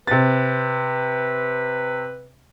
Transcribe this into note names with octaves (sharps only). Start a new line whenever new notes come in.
C3 B4 A6